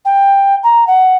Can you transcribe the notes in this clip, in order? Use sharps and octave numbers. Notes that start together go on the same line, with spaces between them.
G5
A#5
F#5